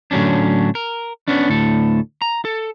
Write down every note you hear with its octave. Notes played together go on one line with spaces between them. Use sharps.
A2 D3 F#3 C#4 D4
A#4
B3 C#4 D4
D2 A2 A4
A#5
A4